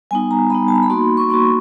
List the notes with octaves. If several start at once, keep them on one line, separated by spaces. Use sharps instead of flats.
G3 B3 D#4 G#5
A#5
G3 B3 D#4 B5
A5
A#5
B5
A#3 D#4 F#4 C6
C#6
A#3 D#4 F#4 C6